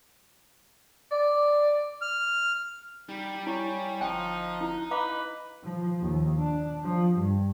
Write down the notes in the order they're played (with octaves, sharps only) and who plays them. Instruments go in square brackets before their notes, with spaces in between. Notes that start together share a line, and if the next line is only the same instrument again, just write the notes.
[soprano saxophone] D5
[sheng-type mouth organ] F6
[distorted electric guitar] G3 G4 [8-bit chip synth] D#4
[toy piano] E4 [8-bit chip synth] C#5 G#5 C#6
[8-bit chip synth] G1 F#6 [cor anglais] F3 [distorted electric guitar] D#4 [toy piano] G5 G#5
[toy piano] E4
[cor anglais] B4 [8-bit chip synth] D#5 [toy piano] F5 A#5 D6
[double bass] F3
D#2
D4
F3
G2